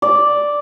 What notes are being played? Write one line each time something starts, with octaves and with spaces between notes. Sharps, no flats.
D5